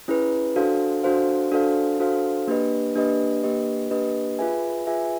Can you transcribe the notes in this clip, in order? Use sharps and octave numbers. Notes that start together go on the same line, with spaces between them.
C#4 E4 G#4 B4
D4 F#4 A4 C5 F5
D4 F#4 A4 C5 F5
D4 F#4 A4 C5 F5
D4 F#4 A4 C5 F5
A#3 D4 G4 B4 D#5
A#3 D4 G4 B4 D#5
A#3 D4 G4 B4 D#5
A#3 D4 G4 B4 D#5
F4 G#4 B4 E5 G#5
F4 G#4 B4 E5 G#5